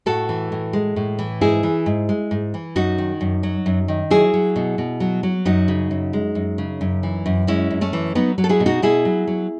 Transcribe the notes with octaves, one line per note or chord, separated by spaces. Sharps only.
A2 F#4 A4
E3
A2
G#3
A2
E3
G#2 E4 G#4
E3
G#2
G#3
G#2
E3
F#2 D#4 F#4
D#3
F#2
F#3
F#2
D#3
F#3 E4 G#4
F#3
B2
B2
F#3
F#3
F#2 D#4 F#4
C#3
F#2
G#3
F#2
C#3
F#2
E3
F#2
G#3 C#4 E4
F#2
A3 C#4
E3
F#3 B3 D#4
F#3
A4
E4 G#4
B2
D#4 F#4
B2 E4 G#4
F#3
F#3